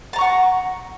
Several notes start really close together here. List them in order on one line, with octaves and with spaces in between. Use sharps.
A5 A#5 C#6 F#5